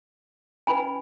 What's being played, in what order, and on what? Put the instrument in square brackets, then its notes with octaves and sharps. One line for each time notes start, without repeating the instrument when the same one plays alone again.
[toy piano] C#4 E4 B4 G#5 B5